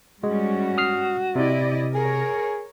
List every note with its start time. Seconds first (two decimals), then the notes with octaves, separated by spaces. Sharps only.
0.23 G#2 G3 G#3 C#4 F#4
0.78 D#6 F6 C7
1.36 C3 E4 D5 D#5
1.95 G#4 A#4 C#5